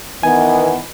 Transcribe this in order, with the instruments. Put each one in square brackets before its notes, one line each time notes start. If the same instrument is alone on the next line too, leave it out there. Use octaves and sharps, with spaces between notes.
[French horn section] D#3 E3 B3 [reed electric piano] G#5